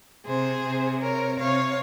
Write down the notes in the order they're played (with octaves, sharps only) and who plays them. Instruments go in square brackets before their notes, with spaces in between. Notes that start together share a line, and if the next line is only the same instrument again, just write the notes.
[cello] C3 [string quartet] G#4 C5
[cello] C3
[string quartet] A#4 C#5
[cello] C3 [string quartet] C#5 F5